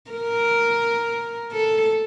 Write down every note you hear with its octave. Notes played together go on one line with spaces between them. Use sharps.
A#4
A4